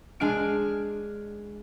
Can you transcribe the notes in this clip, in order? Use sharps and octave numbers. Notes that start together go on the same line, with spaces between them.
G#3 D4 G#5 F6 D7